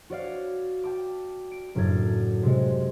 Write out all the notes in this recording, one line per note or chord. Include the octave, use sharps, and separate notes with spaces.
F#4 C#5 D5 F5
G5 A5 D6
D7
F#1 F#2 A2 A4 G#6 A6
C3 G#3